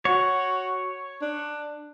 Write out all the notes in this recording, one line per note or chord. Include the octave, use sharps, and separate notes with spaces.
F#4 C#5
D4